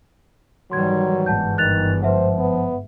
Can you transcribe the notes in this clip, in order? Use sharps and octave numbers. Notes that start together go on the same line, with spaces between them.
G#2 D#3 E3 F#3 G3 C6 G#6
G1 G#2 F#5 A5 G6
D#3 F#6 A6 F7
F3 B4 C5 E5 F#5
B3